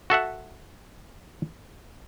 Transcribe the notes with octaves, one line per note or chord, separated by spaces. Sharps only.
F#4 A4 E5 F#5